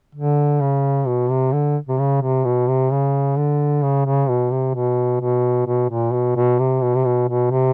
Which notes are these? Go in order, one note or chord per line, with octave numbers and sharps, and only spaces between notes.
D3
C#3
B2
C3
D3
C3
C#3
C3
B2
C3
C#3
D3
C#3
C#3
B2
C3
B2
B2
B2
A#2
B2
B2
C3
B2
C3
B2
B2
C3